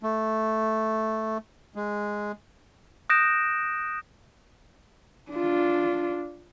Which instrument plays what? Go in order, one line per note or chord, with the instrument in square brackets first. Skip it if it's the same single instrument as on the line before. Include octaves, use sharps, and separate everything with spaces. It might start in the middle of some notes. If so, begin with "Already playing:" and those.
[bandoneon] A3
G#3
[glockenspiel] D#6 F#6 G6 A#6 D7 E7
[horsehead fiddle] D4 F4